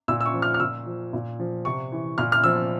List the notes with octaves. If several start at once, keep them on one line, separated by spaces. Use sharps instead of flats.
A#2 E6
E6
C#6
F3
F6
F6
A#2 E6
F3
A#2
F3
C3 C#6
E3
A#2 F6
F6
F3 E6